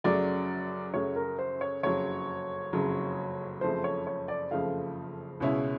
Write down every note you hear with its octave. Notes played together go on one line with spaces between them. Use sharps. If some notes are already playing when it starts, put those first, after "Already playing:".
F#2 C#3 F#3 A3 D5
F#2 C#3 F#3 A3 C#5
A#4
C5
C#5
F#1 F2 C#3 F#3 C#5
F#1 F2 C#3 F#3
F#1 F2 C#3 F3 A3 C5
C#5
C#5
D5
F#1 F2 C#3 F3 A3 F5
C#2 B2 G#3 C#4 E4